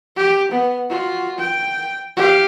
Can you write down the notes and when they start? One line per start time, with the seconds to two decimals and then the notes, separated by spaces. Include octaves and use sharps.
0.16 G4
0.51 B3
0.90 F4 F#4
1.39 G5
2.16 G4 F5